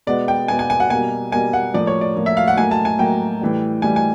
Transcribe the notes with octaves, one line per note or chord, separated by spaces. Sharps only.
B2 G#3 B3 D5
G5
B2 G#3 B3 G#5
G#5
G#5
F#5
B2 G3 A#3 G#5
B2 G3 A#3 G#5
F#5
A2 F3 A#3 D5
C#5
D5
A2 F3 A#3
E5
F5
F#5
A2 F#3 A#3 G#5
A5
G#5
A2 F#3 A#3 G5
A2 E3 G3
A2 E3 G3 G#5
G#5